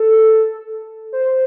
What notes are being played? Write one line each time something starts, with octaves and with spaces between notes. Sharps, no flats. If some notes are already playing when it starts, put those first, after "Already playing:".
Already playing: A4
C5